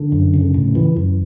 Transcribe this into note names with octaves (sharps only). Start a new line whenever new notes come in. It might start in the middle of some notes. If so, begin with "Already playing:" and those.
Already playing: D3
F#2
C#3
A2
E3
F#2